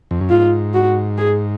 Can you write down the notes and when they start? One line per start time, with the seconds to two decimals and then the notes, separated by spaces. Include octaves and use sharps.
0.11 F2
0.21 F#2
0.30 G#2 F4
0.74 F#4
1.18 G#4